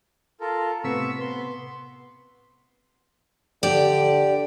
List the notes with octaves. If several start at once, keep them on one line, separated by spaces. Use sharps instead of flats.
F4 A4 A#4
A2 C3 B3 C#6 E6 B6
B3 C6
D3 G4 D5